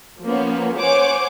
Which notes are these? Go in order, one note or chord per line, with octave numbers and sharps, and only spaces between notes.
F3 A#3 B3 C#4
C5 C#5 F#5 G#5 D6